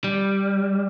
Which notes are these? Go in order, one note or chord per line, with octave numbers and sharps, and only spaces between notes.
G3